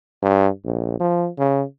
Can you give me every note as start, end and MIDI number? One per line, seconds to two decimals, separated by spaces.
0.23 0.48 43
0.65 0.98 34
1.00 1.28 53
1.38 1.63 49